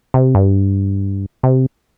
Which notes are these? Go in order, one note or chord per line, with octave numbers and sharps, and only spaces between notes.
C3
G2
C3